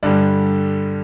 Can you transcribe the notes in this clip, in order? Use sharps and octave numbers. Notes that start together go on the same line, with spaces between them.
G2 D3 G3 D5